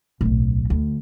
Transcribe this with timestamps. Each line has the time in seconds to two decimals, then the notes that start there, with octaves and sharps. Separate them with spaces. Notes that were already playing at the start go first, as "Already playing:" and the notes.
0.21 D1 B1
0.70 D2